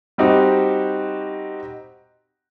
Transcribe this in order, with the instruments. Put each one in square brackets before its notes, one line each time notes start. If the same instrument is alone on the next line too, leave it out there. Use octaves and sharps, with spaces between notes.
[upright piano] G3 C4 D#4 F#4 G4